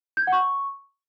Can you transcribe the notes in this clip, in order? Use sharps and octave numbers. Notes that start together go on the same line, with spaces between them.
G6
G#6
F#5
C#6